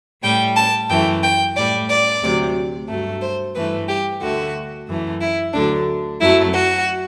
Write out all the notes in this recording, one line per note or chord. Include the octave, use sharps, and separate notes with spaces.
A2 G3 G5
A5
F#2 E3 A3 G5
G5
A2 G3 D5
D5
D2 C3 F#3
G2 F#3 A3
C5
G2 E3 A3 B4
G4
D2 D3 A3 F#4
F#2 E3 A3
E4
D2 D3 F#3 D4
F#2 F#3 A3 E4
F#4